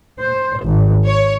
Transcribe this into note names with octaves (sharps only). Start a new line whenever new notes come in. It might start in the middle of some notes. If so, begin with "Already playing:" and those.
C5
G#1
C#5